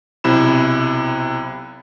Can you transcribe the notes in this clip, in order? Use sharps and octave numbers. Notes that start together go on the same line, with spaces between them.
B1 C3 E4 B5 E7